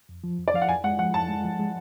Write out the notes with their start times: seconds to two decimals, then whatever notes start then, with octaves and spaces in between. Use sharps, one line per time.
0.09 F2
0.24 F3
0.39 F2
0.48 D5
0.54 F3 F5
0.62 F#5
0.69 F2 G#5
0.84 G#3 F#5
0.99 F3 F#5
1.14 F2 A5
1.29 G#3
1.44 F3
1.59 G#3